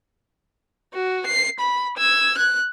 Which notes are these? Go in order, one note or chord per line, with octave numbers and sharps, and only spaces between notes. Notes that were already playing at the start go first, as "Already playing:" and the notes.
F#4
C7
B5
E6 G#6
F#6